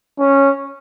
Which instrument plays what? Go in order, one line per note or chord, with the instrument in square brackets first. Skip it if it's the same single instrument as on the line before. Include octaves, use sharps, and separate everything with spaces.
[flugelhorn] C#4